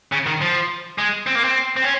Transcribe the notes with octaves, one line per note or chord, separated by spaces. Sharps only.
C#3
D#3
F3
G#3
C4
A#3
C4
C4
C#4